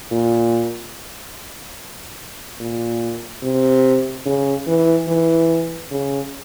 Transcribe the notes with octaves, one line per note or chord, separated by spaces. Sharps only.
A#2
A#2
C3
C#3
E3
E3
C#3